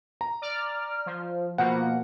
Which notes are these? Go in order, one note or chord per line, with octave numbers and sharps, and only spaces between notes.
A#5
D5 F6
F3
B2 F3 A#3 F#5